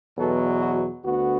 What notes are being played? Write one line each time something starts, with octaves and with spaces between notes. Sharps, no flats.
E2 B2 F#3 A4
F#4
D2 D3 B3 F#4